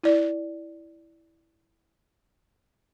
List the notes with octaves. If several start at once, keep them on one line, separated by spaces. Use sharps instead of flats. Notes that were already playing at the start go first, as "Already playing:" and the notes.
E4 D5